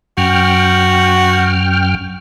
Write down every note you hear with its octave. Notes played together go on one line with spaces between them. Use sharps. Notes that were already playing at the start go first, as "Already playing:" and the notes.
F#2 F#4 G5 F6